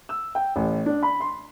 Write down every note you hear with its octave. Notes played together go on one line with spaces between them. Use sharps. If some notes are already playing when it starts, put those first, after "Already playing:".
E6
G5
A1
D4
B5
C6